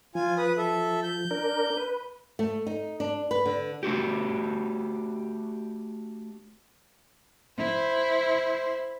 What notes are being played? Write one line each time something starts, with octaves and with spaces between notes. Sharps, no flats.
F3 F4 G#5
B4 D#6
A4 E5
G6
D4 A#4
B4
A3
D#4
D4
B4
D3
A3 D4 F#4 G4
E4 C5